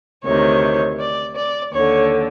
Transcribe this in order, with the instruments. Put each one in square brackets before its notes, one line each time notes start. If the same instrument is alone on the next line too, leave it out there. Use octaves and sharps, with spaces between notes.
[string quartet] D2 C3 D#3 C#5
D5
D5
D#2 D3 C#5